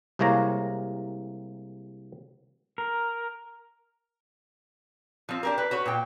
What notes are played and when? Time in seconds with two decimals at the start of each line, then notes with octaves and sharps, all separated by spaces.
0.19 C2 C3 G#3 A#3 C#5 A#5
2.78 A#4
5.29 F3 C4
5.43 D4 G4 A#4
5.58 B4
5.71 F#4 B4 C#5
5.86 A#2 G5